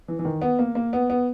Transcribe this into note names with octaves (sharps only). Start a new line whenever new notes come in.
E3
E3
D#3
B3
A#3
A#3
B3
B3